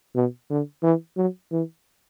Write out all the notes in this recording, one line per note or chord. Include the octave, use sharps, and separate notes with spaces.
B2
D3
E3
F#3
E3